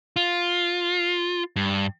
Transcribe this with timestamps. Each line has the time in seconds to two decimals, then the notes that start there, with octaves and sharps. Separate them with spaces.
0.16 F4
1.56 G2